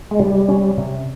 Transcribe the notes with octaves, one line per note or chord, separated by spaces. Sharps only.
G#3
C3 G3
C#4
C3